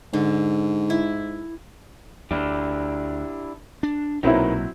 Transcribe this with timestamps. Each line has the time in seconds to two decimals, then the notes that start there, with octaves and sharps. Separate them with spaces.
0.13 G#2 D3
0.90 E4
2.31 D2 D4 E4 G4
3.83 D4
4.23 B1 A#2 F#3 C4 D#4 E4 A#4 B4